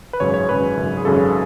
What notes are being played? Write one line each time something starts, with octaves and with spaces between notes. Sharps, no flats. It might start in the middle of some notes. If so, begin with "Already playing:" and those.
B4
G#1 F#2 C#3 C#5
C#5
G#1 F#2 C#3 B4
G#1 F#2 C#3
G#4
G#1 F#2 C#3 A4